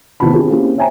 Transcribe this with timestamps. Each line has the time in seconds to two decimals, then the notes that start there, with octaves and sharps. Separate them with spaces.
0.20 A2 C3 D#3 B3 A5 B5
0.34 C4 D4 F4 G4 G#4
0.50 A#3 C4 C#4 E4 G4 G#4
0.77 C5 C#5 E5 G5 G#5 A#5